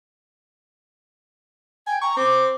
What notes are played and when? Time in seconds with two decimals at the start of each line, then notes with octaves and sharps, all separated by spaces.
1.87 G5 G#5
2.01 A#5 C#6
2.16 C4 D6